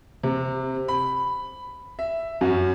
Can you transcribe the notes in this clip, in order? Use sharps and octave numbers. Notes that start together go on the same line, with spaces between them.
C3
B5
E5
F#2